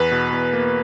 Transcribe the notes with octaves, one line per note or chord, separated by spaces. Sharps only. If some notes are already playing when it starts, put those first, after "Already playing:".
Already playing: E2 B4
B2
E2
A#3